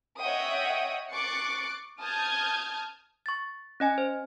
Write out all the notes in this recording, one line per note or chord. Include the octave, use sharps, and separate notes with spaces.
C#5 D#5 E5 F#5 G5 D#6
C#6 D6 F#6 A6 C7 C#7
A5 D#6 F6 G6 G#6
C#6 A6
C#4 D#5 G#5
C5